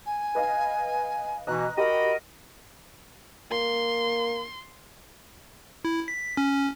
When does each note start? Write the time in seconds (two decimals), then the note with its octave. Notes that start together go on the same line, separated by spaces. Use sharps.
0.06 G#5
0.35 B4 D#5 F5
1.47 B2 E3 D#5 A#5 F#6
1.77 F#4 G4 A#4 D#5 B5
3.51 A#3 C6
5.85 E4
6.08 B6
6.37 C#4